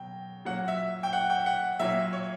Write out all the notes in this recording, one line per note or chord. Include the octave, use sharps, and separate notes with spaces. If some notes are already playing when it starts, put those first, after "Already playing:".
Already playing: B2 F#3 G5
A#2 F#3 F#5
E5
G5
F#5
G5
F#5
A#2 F#3 E5
C#5